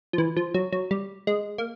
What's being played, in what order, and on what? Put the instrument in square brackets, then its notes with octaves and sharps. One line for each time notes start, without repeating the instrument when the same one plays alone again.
[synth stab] F3
E3
F3
F#3
F#3
G3
G#3
A#3